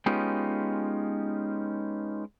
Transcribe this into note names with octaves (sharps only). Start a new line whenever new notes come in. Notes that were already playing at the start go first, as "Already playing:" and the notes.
G#3 B3 C#4 D#4 F4 G4